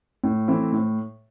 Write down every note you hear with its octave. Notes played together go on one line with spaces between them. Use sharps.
A2
E3 A3 C4 E4
A2